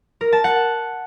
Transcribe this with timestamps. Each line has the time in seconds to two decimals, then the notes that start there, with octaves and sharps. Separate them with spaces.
0.21 A#4
0.32 A5
0.44 F#5